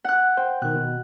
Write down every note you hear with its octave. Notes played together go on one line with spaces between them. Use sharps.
F#5 F#6
C5 G5
B2 D#3 F#6
B2